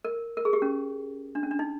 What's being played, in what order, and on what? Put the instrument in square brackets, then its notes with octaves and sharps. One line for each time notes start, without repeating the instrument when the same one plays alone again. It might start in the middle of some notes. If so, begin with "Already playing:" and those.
[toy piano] A#4
A#4
G#4
G4
C#4
D4
C#4
D4
D#4